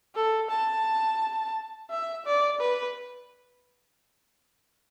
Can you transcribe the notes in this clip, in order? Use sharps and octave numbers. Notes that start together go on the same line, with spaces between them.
A4
A5
E5
D5
B4